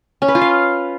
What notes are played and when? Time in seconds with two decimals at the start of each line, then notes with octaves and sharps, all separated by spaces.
0.22 C#4
0.28 B4
0.35 F4
0.41 F5